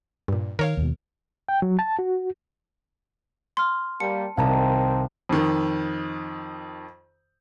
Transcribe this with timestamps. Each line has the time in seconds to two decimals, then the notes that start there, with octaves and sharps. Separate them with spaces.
0.28 G2 A#2
0.59 D#3 A#4 C#5 F5
0.77 D#2 B2
1.49 G5
1.62 F#3
1.79 A5
1.99 F#4
3.57 C6 F6
4.00 G3 A#3 A5 C#7
4.37 C2 D#3 C4 F5 A5 A#5
5.29 F2 D#3